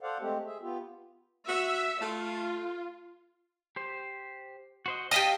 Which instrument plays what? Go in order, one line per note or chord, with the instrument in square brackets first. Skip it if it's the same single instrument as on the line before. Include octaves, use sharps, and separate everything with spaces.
[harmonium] A4 C5 D5 F5 F#5
G#3 A3 C4 G4
G#4 E5
B3 F4 G4
[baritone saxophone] F#4 [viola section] E5
[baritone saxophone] A3 [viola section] F4
[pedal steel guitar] G4 C5
F#4 C5 D#5
[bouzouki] G4 F5 A5 [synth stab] D#5 D#6 B6 [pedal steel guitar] F6